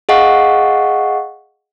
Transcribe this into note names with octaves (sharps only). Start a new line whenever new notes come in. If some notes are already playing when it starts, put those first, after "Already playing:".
G#4 D#5 F5 F#5 C#6